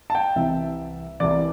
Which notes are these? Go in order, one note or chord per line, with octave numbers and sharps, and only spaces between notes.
A5
G5
C2 C3 E3 E5
C2 C3 E3 D5